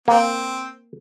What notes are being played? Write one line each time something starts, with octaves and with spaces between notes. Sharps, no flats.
A#3 C4